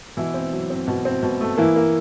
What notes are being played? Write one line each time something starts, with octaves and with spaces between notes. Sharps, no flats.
B2 E3 E4
C4
F#3
C4
B2
C4
B2
A3
E3 A#3 E4
A#3